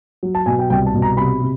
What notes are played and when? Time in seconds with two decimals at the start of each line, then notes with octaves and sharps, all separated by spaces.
0.23 F#3
0.35 A5
0.46 B2 G#5
0.59 G5
0.70 C2 G5
0.86 A5
0.94 B2
1.02 A#5
1.17 C3 B5
1.41 C3